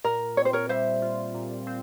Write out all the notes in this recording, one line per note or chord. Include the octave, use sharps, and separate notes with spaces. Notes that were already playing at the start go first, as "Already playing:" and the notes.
A#2 A#4
C4 C#5
C5
A#4 C#5
G3 C5 E5
F4
A#2
C4